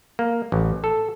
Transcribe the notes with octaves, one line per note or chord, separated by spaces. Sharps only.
A#3
A1
A4